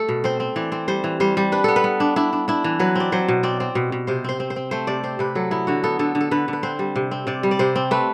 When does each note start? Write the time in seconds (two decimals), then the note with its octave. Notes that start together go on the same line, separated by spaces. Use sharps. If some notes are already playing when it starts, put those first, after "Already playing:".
Already playing: A3 A4
0.09 B2
0.24 C4 C5
0.40 C4
0.56 E3 D5
0.72 C4
0.88 G3 C5
1.04 E3
1.20 G3 C5
1.37 G3
1.52 D4 B4
1.64 B3 A4
1.76 B4
1.84 B3
2.00 D4
2.16 D4 E4
2.33 D4
2.48 D4 E4
2.64 E3
2.79 F#3 B4
2.95 C4 D5
3.12 F#3 C5
3.28 B2
3.43 C4 D5
3.60 C4
3.75 B2
3.92 B2
4.07 C3 C5
4.24 C4 C5
4.40 C4
4.50 C5
4.56 C4
4.71 A3 C5
4.87 C3 D5
5.03 C4 C5
5.19 C3 B4
5.35 F#3 A4
5.51 B3 E4
5.67 D3 F#4
5.84 B3 A4
5.99 D3 A4
6.15 D3
6.20 A4
6.31 D3 B4
6.48 D3
6.53 B4
6.63 C4 C5
6.79 G3
6.96 C3
7.11 C4
7.27 C3 D5
7.43 G3
7.51 D5
7.59 C3 C5
7.76 C4
7.91 A3 B4